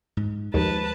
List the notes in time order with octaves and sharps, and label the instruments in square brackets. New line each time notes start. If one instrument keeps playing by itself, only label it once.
[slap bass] G#2
[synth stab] D#2 [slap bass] F3 G#3 [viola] B4 A5